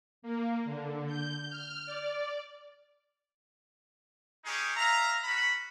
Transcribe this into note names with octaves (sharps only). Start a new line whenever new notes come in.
A#3
D3
G6
F6
D5
G#3 C#4 D#4 G4 G#4
E5 F5 A#5
C#4 F#4 B5